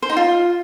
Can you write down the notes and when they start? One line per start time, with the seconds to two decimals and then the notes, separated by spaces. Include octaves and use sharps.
0.02 C5
0.10 D#4
0.17 F4